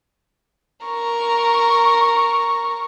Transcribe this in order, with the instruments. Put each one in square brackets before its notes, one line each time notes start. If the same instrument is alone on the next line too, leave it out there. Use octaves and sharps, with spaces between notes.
[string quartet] A#4 C#6